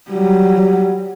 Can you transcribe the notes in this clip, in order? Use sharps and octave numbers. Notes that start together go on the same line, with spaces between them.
F#3 G3